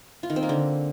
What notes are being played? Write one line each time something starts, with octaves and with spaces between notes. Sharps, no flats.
F4
D#3
C4
A#3
D3